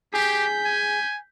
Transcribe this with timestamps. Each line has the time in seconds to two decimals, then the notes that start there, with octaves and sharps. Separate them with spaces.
0.14 G4 G#4 G6 B6
0.64 G#5